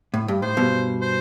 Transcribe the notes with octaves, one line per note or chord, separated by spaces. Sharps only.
A2
G2
A2 C5
G2 B2
C5